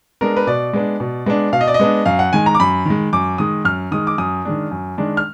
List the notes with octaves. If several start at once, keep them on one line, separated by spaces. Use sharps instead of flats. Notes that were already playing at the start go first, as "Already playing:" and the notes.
G#3 B3 D4 A#4
B4
B2 D5
G#3 B3 D4
B2
G#3 B3 D4
B2 F5
D#5
D5
D#5
G#3 B3 D4
F#2 F5
F#5
D#3 G#3 G#5
A#5
D6
F#2 B5
D#3 G#3
F#2 D6
D#3 G#3 D#6
F#2 F6
D#3 G#3 D#6
D6
F#2 D#6
D#3 G#3 D4
F#2
D#3 G#3 D4
F6